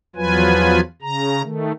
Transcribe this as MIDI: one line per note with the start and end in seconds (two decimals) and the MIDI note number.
0.16 0.80 40
0.16 0.80 53
0.16 0.80 54
0.16 0.80 65
0.16 0.80 71
0.16 0.80 80
1.02 1.42 49
1.02 1.42 82
1.43 1.72 51
1.43 1.72 57